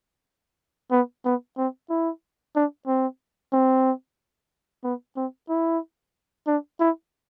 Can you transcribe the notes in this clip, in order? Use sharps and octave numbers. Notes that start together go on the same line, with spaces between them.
B3
B3
C4
E4
D4
C4
C4
B3
C4
E4
D4
E4